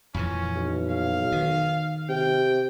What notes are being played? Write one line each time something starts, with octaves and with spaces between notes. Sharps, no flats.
F2 A#2 E3 C#4
B1
F5
D#3
C3 G5